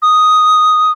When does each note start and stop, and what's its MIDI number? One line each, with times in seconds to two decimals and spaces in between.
0.02 0.92 87